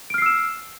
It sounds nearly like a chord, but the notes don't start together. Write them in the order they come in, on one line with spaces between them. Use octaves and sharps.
D7 F6 C7 E6 E7